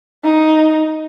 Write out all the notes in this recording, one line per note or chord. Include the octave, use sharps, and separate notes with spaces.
D#4